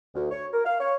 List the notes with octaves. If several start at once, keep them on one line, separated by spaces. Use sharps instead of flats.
D2
C#5
A#4
F5
C#5